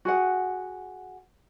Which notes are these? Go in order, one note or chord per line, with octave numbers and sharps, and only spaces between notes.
F#4 G#4 F#5